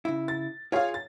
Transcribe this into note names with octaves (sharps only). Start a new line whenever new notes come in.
C#3 E4
A6
F4 G#4 C#5 F5
A6